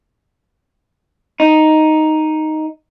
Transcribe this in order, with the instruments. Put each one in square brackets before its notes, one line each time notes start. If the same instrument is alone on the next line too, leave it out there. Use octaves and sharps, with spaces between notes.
[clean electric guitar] D#4